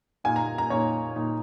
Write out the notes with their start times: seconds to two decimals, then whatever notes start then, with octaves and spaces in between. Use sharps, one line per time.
0.24 A#2 A#3 D#4 G#5
0.36 A#5
0.58 A#5
0.70 A#2 A#3 D#4 C#5
1.16 A#2 A#3 D#4